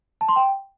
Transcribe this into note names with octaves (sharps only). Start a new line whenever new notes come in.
A5
C6
G5